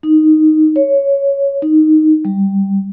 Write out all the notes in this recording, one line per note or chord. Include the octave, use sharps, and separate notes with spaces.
D#4
C#5
D#4
G3